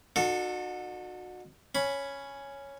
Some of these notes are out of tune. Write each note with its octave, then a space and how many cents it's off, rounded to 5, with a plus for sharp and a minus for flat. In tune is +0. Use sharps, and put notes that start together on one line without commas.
D#4 -45 F#4 -25 A4 +15
C#4 +0 B5 +0